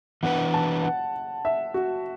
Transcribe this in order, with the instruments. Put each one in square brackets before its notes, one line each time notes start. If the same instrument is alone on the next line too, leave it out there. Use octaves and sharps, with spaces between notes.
[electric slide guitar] E3 B3 D4 B4 [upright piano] F#5
[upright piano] A5
F#5
E5
F#4